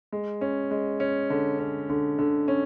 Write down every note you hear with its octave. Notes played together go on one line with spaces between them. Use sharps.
G#3
C#4
G#3
C#4
D3
C#4
D3
D3
C#4